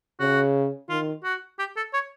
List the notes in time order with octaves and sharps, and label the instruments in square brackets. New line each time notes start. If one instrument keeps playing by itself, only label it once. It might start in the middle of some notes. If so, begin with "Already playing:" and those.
[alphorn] C#3 [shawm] F#4
[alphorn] D#3 [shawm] F4
[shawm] F#4
G4
A4
C#5